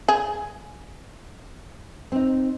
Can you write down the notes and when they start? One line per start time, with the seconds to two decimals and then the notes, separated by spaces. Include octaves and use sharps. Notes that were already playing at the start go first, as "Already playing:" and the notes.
0.09 G#4
2.12 C4 D#4